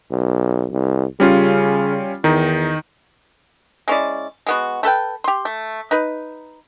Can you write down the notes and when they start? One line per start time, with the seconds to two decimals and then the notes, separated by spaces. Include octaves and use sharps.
0.11 B1
0.71 C2
1.20 C#3 G3 C#4 F4
2.24 E2 D#3 D#4
3.88 G#3 C#4 E4 D5
4.47 G#3 B3 F#4
4.83 A3 A4 B4 G5
5.24 G4 C6
5.45 A3
5.91 D#4 B4